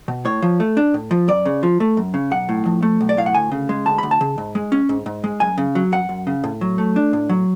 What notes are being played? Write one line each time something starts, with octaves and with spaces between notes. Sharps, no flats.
B2
A2 C#5
F3
A3
D4
A2
F3
F#2 D5
C#3
F3
A3
F#2
C#3
B1 F#5
A2
F3
A3
B1
D5
A2 F5
F#5
D2 G#5
C#3
G#3
D2 A5
D2 B5
A5
C#3
G#2
G#3
C#4
G#2
G#2
G#3
F#2 G#5
C#3
F#3
F#2 F#5
F#2
C#3
A2
F#3
A3
D4
A2
F#3